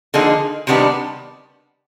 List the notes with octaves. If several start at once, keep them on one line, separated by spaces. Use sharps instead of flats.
D3 F3 A#3 D#4 G#4
C3 D#3 G3 B3 D4